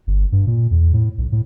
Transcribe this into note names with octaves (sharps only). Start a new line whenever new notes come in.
G1
G2
A#2
E2
A2
B1
A2